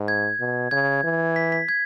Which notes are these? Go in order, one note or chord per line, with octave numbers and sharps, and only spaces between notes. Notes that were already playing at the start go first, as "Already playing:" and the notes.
Already playing: G#2
G#6
B2
C#3 G#6
E3
B6
B6
G#6